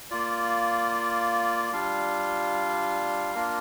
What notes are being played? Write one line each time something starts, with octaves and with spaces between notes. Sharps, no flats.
A#3 F4 D5
G3 D4 F4 F5
A#3 D4 F4 A#4